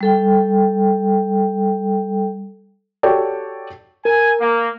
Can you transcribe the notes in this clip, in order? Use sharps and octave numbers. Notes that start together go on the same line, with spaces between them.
G3 A4 G5
F#4 G4 A4 C#5 D5 G5
A#4 G#5
A#3